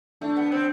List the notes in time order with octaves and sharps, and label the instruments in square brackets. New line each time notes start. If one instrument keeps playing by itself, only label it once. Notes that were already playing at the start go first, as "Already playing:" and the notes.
[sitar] A3 [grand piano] D4
[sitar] B3
C4